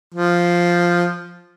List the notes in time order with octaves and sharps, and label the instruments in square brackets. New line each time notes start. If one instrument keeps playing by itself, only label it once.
[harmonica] F3